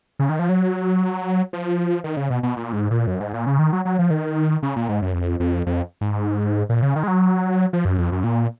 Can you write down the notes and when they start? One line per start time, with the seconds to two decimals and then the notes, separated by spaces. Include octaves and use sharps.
0.19 C#3
0.29 D#3
0.39 F3
0.49 F#3
1.53 F3
2.04 D#3
2.17 C#3
2.30 B2
2.43 B2
2.57 A#2
2.73 G#2
2.91 A#2
3.07 F#2
3.20 G#2
3.33 A#2
3.46 C#3
3.59 D#3
3.73 F#3
3.85 F#3
3.99 F3
4.10 D#3
4.63 C#3
4.76 A#2
4.89 G#2
5.02 F#2
5.14 F2
5.40 F2
5.66 F2
6.01 G#2
6.69 A#2
6.82 C#3
6.96 D#3
7.03 G#3
7.08 F#3
7.73 F3
7.85 F#2
7.98 F2
8.12 F#2
8.24 A#2